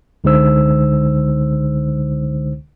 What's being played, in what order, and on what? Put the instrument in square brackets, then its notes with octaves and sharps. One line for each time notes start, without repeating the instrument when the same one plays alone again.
[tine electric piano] C#2 D3 G#3 D#4 C5 E6